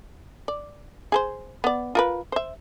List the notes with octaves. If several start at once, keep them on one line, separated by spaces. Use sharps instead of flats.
D5
G#4 A4 C5
B3 D5
F4 A#4 B4
C5 E5